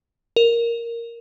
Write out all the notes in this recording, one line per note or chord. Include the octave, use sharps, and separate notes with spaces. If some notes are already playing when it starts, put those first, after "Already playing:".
A#4